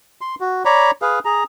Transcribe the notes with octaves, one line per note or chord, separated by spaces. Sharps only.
C6
F#4
C#5 D5 A#5 B5
G#4 B4 F5
G#4 A#5